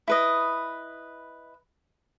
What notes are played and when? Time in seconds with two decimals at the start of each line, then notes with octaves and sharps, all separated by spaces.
0.08 E4 B4 D#5